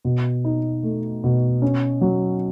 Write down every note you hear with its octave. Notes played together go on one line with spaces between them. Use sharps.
B2
D#4
A3
B2
C#4
F#3